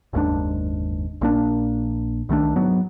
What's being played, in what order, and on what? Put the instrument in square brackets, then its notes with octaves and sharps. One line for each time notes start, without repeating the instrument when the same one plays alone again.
[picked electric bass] F#1 D#2 G#2 D4
A#1 A#3 D4
C2 D#3 A3 D4
G#2 F#3 B3